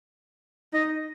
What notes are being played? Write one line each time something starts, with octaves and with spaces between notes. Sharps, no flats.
D#4 D#5